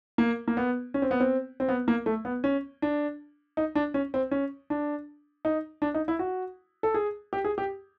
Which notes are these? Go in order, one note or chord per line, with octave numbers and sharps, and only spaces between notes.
A#3
A#3
B3
C#4
C4
B3
C4
C4
B3
A#3
A3
B3
C#4
D4
D#4
D4
C#4
C4
C#4
D4
D#4
D4
D#4
E4
F#4
A4
G#4
G4
G#4
G4